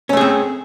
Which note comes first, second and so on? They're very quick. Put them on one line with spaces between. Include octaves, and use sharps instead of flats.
C#4 A3 G#4 C4